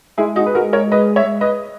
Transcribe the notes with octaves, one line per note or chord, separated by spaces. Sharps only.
G#3 E4 G#4
D#4 F#4
B4
F#4 A#4
A#4 C#5
B4 D#5
C#5 E5
B4 D#5